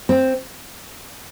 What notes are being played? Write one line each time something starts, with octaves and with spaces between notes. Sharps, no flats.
C4